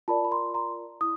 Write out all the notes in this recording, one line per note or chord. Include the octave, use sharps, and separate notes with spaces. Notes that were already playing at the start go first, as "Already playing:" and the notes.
F4 A#4 D5 A5 B5
B5
A#5 C6
A#5 C6
E4 D#6